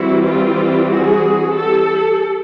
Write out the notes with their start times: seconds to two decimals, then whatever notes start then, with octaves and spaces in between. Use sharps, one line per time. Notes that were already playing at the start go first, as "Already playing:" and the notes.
Already playing: E3 G3 C4 E4 F#4
0.25 F4 G4
0.91 F#4 G#4
1.57 G4 A4